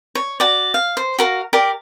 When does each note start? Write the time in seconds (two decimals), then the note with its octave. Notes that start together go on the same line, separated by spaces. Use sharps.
0.15 C#5
0.40 F#4 D5
0.74 F5
0.97 C5
1.19 F#4 A#4 F5
1.53 G4 A#4 D5